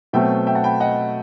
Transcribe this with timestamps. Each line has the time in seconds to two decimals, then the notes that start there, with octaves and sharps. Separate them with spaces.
0.13 B2 F#3 A3 C4 E5 G5
0.47 E5 G5
0.55 F#5 A5
0.64 G5 B5
0.80 D#5 F#5